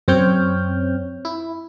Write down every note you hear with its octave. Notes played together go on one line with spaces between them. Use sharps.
F#2 C4 C#5 G5 F6 G6
E4